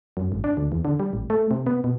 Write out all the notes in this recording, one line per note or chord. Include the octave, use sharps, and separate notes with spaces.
F#2
G#1
D4
D2
E2
D3
G3
A1
A3
C3
B3
B2